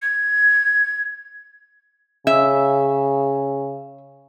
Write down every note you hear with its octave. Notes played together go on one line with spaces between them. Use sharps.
G#6
C#3 E5